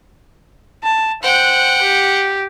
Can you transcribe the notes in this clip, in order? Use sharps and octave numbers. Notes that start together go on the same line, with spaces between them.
A5
C5 F#5 G5 F#6
G4